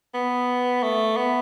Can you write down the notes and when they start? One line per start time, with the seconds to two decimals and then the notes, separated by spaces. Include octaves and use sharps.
0.14 B3
0.83 A3
1.17 B3